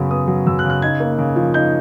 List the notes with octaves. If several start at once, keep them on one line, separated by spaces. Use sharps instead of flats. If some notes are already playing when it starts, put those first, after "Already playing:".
Already playing: F#2 C#3 F#3 B3
B3 D#6
F#3
F#2 E6
F#6
C#3
F#6
D#4 G#6
A#3
C#3
F3
D#4 G6